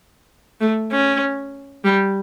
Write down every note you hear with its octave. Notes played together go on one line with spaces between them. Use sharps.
A3
C#4
G3